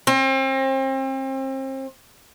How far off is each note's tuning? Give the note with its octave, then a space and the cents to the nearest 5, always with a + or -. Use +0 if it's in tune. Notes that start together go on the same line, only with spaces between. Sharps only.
C4 +35